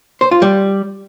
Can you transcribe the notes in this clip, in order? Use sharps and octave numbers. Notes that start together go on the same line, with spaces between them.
C5
F4
G3